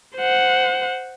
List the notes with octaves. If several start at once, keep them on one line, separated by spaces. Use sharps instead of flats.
C5 F#5